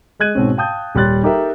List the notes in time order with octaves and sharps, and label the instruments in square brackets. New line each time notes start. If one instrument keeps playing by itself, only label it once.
[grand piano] G#3 D#5 F#6 G#6 D#7
G#2 B2 C4 C#4
F5 G5 A5 D#6 G6
D#1 G3 C#5 C6 F#6 A6
D#4 G4 A4 A#4 D#5 E5